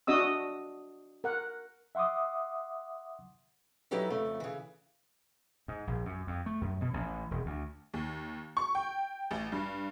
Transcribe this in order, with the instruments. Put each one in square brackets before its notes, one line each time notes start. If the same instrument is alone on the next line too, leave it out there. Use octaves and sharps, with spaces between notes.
[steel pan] D4 F#4 D#5 D#6 E6
A#4 F#5
[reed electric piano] E5 F#5 C6 D6 D#6
[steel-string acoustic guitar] F#3 D#4 E4 G4 A4 B4
F2 C#3 A3
C#3 E3
[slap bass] G#2
A#1
F#2
F2
A3
F#2
B2
A1
E1
D2
[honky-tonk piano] D#2
C#6
G5
A1
G2